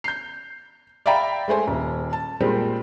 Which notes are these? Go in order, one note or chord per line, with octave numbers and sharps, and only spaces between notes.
G6 C7
D5 E5 F5 G5 A#5 B5
G#3 A3 C5 G#5
D#1
A5
A#2 G3 G#3 C4